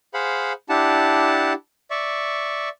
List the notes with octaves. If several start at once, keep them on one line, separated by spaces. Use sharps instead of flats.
G#4 C5 F5 F#5 B5
D4 E4 G4 F#5 A5
D5 E5 C#6